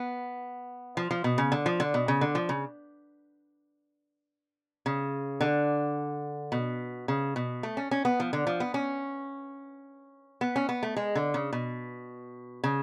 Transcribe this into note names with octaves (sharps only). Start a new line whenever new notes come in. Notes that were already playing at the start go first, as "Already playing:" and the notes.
Already playing: B3
F3
F3
B2
C#3
D3
F3
D3
B2
C#3
D3
F3
C#3
C#3
D3
B2
C#3
B2
A3
C#4
C#4
B3
F3
D3
F3
B3
C#4
B3
C#4
B3
A3
G#3
D3
C#3
B2
C#3